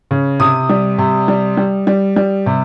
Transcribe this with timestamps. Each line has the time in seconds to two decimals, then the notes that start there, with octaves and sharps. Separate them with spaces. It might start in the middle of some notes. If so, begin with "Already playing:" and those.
0.11 C#3
0.40 C3 D#6
0.69 G3
0.98 C3
1.28 G3
1.57 G3
1.87 G3
2.16 G3
2.46 C3